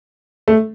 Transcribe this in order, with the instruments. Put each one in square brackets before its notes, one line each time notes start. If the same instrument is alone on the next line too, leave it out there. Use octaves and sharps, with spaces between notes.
[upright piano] A3